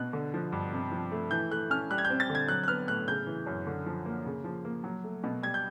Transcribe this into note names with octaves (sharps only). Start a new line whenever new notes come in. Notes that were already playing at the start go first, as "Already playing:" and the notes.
Already playing: B2 F#6
D3
F3
G2
C3
F3
A3
E3 G6
A3 F#6
C#4 F6
G3 F#6
G#6
G6
C4
A6
D3
G#6
F#3 F#6
F#6
B3 F6
A2 F#6
C#3 G6
E3
F#2
D3
F3
A#3
C#3
F3
A#3
F#3
A3
B2
G3 G#6
G6